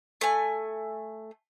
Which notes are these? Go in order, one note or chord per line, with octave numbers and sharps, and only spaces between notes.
A3 G#5